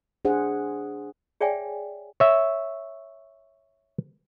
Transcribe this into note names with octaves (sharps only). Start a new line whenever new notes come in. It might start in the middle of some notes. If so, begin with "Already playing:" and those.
D4 G#4 C5 F#5
G#4 C#5 D5 E5 G5 G#5
C#5 E5